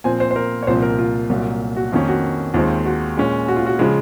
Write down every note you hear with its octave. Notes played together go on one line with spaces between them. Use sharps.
A#2 F3 C4 G#5
C5
C5
A#4
C#5
C2 A#2 F3 C4 C5
A#4
F4
C2 A#2 F#3
F#4
F2 D#3 A#3 C#4 F4
F#4
D#2 D#3 G#3 C4 F4
F#4
A#2 G#3 C#4
F#4
F4
F#4
C#3 F3 G#3